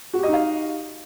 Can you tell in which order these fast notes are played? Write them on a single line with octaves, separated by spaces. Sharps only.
F#4 G4 D#5 D#4 F5